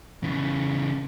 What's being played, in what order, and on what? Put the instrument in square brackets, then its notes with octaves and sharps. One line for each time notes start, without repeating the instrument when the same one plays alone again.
[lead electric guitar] C#3 E3